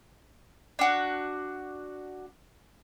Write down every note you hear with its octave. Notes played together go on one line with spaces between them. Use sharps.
D4 F#4